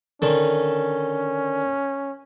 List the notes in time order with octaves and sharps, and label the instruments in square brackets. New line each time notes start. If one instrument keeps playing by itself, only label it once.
[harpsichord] D3 D#3 [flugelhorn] C#4